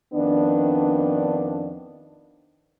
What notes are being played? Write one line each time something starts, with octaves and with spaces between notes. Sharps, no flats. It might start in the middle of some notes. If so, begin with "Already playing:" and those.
F2 D#3 B3 D4